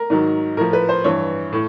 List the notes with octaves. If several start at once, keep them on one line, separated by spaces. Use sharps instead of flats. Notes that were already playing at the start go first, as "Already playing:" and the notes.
Already playing: A#4
G#2 D#3 F#3
A2 F3 A#4
B4
C5
G2 E3 C#5
A2